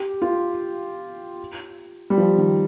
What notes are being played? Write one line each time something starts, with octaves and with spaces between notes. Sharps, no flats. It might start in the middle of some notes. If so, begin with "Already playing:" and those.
Already playing: G4
F4
G3
F3
D#3